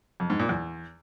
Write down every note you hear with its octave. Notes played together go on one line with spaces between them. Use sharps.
F2
G#2
A#2
E2